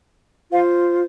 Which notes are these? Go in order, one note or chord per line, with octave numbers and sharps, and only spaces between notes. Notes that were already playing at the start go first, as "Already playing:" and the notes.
F4 C5 F5